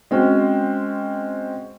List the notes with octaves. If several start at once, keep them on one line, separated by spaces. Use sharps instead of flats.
G#3 C4 C#4 F#4